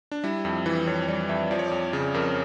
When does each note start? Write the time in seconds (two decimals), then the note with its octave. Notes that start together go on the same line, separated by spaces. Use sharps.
0.12 D4
0.24 G3 E4
0.45 F2 E4
0.66 E3 E4
0.87 F2 C#5
1.08 G3 D5
1.29 F2 E5
1.51 F3 D5
1.59 C#5
1.68 F2 D5
1.93 C#3
2.14 F2 A#4